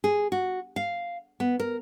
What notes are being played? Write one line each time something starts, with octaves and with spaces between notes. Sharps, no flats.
G#4
F#4
F5
B3
A#4